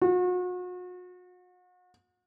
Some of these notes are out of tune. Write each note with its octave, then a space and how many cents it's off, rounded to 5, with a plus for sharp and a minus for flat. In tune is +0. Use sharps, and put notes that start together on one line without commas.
F#4 -40